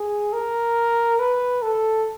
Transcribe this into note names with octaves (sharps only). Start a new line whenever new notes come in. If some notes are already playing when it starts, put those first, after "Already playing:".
Already playing: G#4
A#4
B4
A4